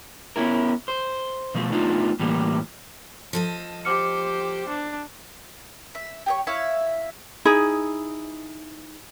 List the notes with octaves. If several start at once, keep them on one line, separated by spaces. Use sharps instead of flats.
B3 C#4 E4 A#4
C5
B2 F3 A3
A3 B3 D4 D#4 F4
A2 E3 G3 A#3
F3 A4 D#5
G4 C5 D6 F6 C#7
D4
E5
G4 G#4 C#5
E4 C#5 E5 F5
D#4 E4 G#4 B5